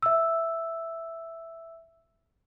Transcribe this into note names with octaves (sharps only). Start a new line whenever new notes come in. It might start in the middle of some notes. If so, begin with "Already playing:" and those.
E5 E6